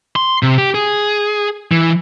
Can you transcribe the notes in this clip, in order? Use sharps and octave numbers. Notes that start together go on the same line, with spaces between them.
C6
C3
G4
G#4
E3